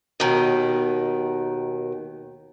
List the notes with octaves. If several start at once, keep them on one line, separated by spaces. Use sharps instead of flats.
D#2 B2 D#3